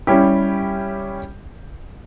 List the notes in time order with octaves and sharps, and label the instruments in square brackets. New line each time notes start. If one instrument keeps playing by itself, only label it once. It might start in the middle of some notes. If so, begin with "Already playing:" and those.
[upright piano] G3 C#4 E4 G4